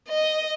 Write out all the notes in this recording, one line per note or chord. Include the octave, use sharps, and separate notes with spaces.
D#5